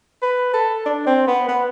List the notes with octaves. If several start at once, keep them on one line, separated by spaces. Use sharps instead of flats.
B4
A4
D4
C4
B3
B3